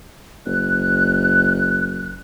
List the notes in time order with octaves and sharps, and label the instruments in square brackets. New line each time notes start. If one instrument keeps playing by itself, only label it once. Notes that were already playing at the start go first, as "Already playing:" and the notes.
[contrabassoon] F#1 [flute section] F#6